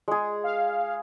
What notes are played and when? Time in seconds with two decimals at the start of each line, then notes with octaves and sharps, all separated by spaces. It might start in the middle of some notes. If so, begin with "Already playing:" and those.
0.08 G#3 G#4
0.44 F5